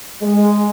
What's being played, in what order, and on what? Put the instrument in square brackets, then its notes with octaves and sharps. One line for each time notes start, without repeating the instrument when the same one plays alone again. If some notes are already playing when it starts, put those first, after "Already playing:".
[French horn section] G#3